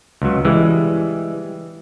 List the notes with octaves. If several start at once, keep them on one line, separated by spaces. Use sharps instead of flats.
C#2 F#3
E3 G3 G#3